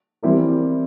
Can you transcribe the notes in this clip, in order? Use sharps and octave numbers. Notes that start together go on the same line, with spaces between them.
E3 G3 C4 E4 A#4